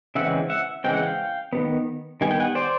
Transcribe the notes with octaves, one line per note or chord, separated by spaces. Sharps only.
C#3 E3 G#3 C4 E5 F#5
E5 F#5
C#3 E3 G#3 C4 G5
F#5
F5 G5
D#3 G3 B3
D#3 G3 B3 G#5
G5
F#5 G#5
C5 D5